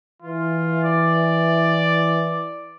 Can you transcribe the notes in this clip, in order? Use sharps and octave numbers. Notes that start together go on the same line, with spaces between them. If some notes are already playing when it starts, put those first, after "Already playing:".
E3 F4
D5